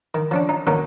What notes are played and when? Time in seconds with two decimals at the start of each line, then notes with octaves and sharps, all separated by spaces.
0.14 D#3
0.31 F3 C#4 D4
0.49 D#4
0.67 B2 D#3 A#3 C#4 D#4